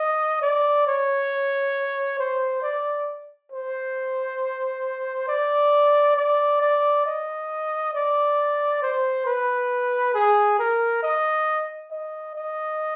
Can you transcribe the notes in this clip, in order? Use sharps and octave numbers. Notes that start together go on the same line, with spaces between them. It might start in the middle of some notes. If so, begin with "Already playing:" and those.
Already playing: D#5
D5
C#5
C5
D5
C5
D5
D5
D5
D#5
D5
C5
B4
G#4
A#4
D#5
D#5
D#5